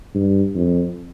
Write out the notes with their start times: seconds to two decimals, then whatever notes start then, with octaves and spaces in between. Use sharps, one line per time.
0.15 G2
0.55 F2